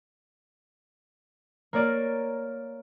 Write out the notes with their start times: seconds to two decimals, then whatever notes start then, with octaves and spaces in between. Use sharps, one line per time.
1.73 A#3 A#4 C#5 D5